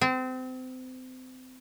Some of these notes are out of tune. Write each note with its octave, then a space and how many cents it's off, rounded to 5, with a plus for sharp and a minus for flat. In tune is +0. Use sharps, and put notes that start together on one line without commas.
C4 -30